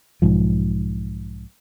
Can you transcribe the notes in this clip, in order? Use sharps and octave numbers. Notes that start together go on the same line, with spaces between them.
B1 G#2 F3